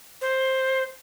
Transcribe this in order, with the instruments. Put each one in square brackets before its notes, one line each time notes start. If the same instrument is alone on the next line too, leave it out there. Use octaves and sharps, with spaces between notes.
[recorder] C5